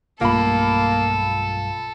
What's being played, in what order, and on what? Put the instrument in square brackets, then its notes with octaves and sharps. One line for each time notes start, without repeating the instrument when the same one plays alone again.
[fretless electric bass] B1 G2 A3 [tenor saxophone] A#3 [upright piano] F4 B5 [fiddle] A4